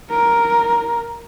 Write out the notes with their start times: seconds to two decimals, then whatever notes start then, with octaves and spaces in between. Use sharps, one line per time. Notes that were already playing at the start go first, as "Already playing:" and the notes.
0.11 A#4